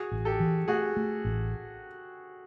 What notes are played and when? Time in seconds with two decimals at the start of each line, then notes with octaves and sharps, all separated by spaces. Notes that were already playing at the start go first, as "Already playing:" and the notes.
Already playing: F#4 G#4
0.12 A1
0.25 G4 A4
0.40 E3
0.68 A3 F#4 G#4
0.97 A3
1.25 A1